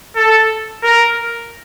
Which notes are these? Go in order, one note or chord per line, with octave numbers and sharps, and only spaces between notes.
A4
A#4